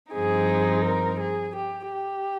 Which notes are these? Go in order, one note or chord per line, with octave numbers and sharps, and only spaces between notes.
G2 F3 C4 D#4 G#4
A#4
G#4
G4
G4